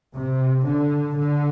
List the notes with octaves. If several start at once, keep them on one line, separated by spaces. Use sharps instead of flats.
C3
D3
D3